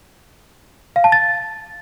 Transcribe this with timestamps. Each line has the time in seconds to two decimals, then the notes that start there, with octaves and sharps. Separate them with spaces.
0.96 F5
1.04 A5
1.12 A6